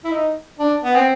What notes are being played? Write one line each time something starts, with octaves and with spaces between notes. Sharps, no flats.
E4
D#4
D4
B3
C4